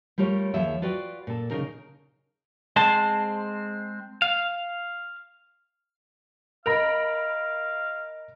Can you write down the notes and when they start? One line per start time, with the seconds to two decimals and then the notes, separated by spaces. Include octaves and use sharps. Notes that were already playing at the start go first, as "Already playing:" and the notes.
0.18 G3 A3 F4 A#4 C#5
0.54 D#2 F3 G#4 C#5 E5
0.82 F4 F#4 B4 D5 G5
1.27 A#2 A4
1.51 C#3 D#4 A#4
2.76 G#3 C4 C5 A5
4.22 F5
6.66 A#4 D#5 F5 B5 A#6 F7